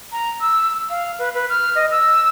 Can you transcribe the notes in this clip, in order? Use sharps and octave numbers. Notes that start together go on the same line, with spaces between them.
A#5
E6
F5
B4
B4
F6
D#5
E6